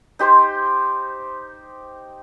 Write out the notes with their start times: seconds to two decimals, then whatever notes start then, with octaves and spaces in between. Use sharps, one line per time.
0.19 D#4 G4 C5 C6